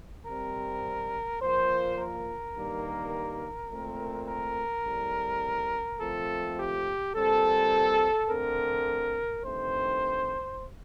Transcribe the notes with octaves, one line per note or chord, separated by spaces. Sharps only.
C3 G3 C4 A#4
A#2 F3 A#3 C5
A#4
G2 D#3 G3 A#3
A#2 A3 C4
A#4
A2 G3 C4
A#2 F3 A3 C4 A4
G4
A#2 G3 C4 A4
D3 A3 C4 A#4
G2 D#3 A3 C4 C5